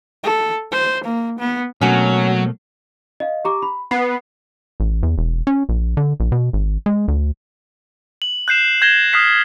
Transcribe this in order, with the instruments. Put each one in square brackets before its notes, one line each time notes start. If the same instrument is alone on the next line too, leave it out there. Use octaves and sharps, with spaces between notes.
[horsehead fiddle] A4
C5
A#3
B3
[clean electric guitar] B2 A3 A#3 [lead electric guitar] F#3 [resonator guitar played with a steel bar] C#4 F#4
[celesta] D#5 F5
G4 A#5 D6
B5
[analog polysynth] B3 [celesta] C7
[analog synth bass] A1
E2
E1
C#4
A#1
D3
A#1
B2
G#1
G#3
D2
[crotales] F#7
F#6 G6 C7 E7
G6 G#6 A#6 E7 G7
D#6 F6 F#6 B6 C7